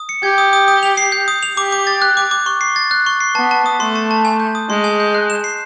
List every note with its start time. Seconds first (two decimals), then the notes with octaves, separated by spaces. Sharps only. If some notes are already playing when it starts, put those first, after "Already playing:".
Already playing: D#6
0.09 C#7
0.23 G4 G#6
0.38 D#6
0.53 D#6
0.68 D#6
0.83 F7
0.97 C7
1.12 G6
1.28 D#6
1.43 F7
1.57 G4 D6
1.72 D6
1.87 A6
2.02 F#6
2.17 D6
2.31 D6
2.46 C#6
2.61 C7
2.76 A6
2.91 F#6
3.06 C#6
3.20 C7
3.35 B3 A5
3.51 A5
3.66 D#6
3.80 A3 C6
3.95 A5
4.11 A5
4.25 G#5
4.40 G6
4.55 D#6
4.70 G#3 C6
4.84 G#5
5.00 G6
5.15 F#6
5.30 E7
5.44 C7